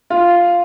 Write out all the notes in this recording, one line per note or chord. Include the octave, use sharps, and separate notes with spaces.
F4